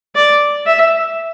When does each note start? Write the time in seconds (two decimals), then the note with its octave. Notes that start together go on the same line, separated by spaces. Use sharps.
0.16 D5
0.66 E5